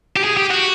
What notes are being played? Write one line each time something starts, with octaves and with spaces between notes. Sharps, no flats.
G4
G#4
G4
F#4